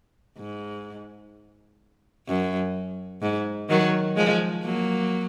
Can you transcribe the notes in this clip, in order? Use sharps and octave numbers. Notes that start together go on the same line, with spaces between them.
G#2
F#2
G#2
D#3 F#3
F3 G#3
F#3 A#3